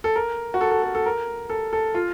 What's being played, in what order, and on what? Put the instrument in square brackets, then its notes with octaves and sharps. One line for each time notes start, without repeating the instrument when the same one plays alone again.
[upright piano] A4
A#4
F#4
A4
A4
A4
A4
A#4
A4
A4
F4